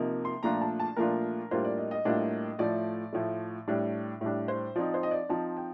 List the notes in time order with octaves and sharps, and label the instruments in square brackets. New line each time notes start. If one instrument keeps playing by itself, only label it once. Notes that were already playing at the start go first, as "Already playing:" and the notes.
Already playing: [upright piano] C3 F3 A#3 D#4
C6
A#2 F3 A3 D4 F4 A#5
A5
A5
A#2 F3 A3 D4 F4 A#4
A2 G3 A#3 D4 F4 C5
D5
D#5
D#5
A2 G3 A#3 D4 F4
A2 F3 A3 D5
A2 F3 A3
A2 G3 D4
A2 G3 D4
C5
F3 C4 D#4 D5
C5
D#5
D5
F3 C4 D#4 A5
G5